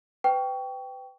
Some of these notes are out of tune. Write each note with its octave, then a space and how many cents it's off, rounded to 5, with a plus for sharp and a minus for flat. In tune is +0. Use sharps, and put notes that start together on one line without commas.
B4 +30 G5 -5 C#6 +25